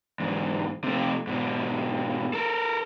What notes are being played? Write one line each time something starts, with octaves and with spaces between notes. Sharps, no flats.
E2 G#2
C3 A3
G#2 B2
A4 A#4